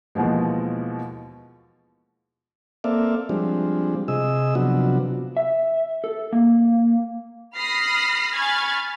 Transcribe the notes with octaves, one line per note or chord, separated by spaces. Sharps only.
D#2 B2 E3 F3 G#3
A#3 C4 A4 D5 E5 F5
F3 G3 G#3 C4 D4
C3 G#4 D#5 E6
C3 F3 F#3 B3 D4 F#4
E5
A4
A#3
B5 D#6 F6 A#6 C7
G#5 B5 C#6 F6 G#6 A6